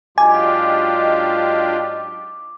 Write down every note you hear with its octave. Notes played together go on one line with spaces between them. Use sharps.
G#2 F#3 D4 F4 G4 D#5 G#5 D6